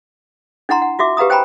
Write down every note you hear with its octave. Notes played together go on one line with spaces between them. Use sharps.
D4 E4 F#5 A#5 C6
F#5
F4 F#4 E5 D6
G4 B4 F5 A#5 D#6
C5 G5 G#5 A#5 B5